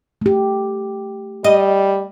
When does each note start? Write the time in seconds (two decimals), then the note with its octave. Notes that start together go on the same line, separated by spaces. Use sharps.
0.21 A3 G4
1.44 G3 D#5